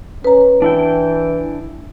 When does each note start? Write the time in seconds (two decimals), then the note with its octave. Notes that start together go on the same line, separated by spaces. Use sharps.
0.25 C#4 B4 A#5
0.62 E3 D4 E4 G5